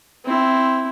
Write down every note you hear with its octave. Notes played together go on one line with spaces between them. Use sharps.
C4 E4